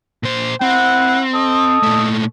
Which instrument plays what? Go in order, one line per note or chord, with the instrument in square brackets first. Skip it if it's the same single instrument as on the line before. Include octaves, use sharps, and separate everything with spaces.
[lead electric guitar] A#2 C5
[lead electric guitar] C4 [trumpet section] E4 F#5
[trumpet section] A4 D#5 D#6
[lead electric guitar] A#2 A3